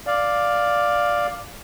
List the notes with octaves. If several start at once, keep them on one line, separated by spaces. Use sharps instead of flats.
D5 F5